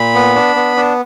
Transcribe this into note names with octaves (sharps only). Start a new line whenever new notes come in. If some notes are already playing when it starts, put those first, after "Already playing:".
Already playing: A#2 B5
B3
D4
B3
D4